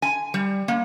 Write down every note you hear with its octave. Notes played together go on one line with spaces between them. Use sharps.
G#5
G3
A#3